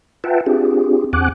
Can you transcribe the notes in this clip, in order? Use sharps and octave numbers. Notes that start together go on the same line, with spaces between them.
F4 B4 E5 F#5 G5 A5
C4 D4 F4 G4 G#4
E2 C4 F#5 G#5 D6 F#6